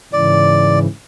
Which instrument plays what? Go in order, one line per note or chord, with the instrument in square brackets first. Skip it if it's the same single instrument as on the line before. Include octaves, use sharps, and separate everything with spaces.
[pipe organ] G#2 C#3 E3 [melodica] D5